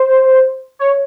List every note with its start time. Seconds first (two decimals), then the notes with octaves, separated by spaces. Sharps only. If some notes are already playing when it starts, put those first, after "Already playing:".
Already playing: C5
0.79 C#5